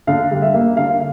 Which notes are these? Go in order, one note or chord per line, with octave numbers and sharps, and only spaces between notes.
D3 F5
G3
E5
A#3
D3 F5